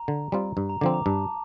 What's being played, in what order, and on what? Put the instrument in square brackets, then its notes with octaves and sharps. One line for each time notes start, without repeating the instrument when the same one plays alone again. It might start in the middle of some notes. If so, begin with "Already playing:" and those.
Already playing: [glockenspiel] A#5
[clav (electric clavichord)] D3
G3 C4 F4
G2
[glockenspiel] A#5
[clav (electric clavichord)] D3 F3 C4 [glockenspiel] D6
[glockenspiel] A#5
[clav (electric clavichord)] G2 [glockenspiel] A5